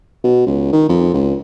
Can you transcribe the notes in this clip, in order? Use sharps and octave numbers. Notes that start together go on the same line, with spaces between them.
B2
C#2
D#3
F2
C#2